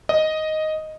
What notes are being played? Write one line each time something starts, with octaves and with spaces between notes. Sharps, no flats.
D#5